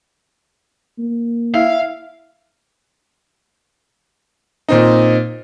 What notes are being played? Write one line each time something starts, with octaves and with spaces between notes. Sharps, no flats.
A#3
E4 E5 F5
A#2 C4 D#4